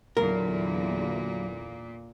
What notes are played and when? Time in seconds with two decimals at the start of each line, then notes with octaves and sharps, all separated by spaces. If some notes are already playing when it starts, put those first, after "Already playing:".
0.17 E2 A#2 D3 F#3 A#3 E4 A#4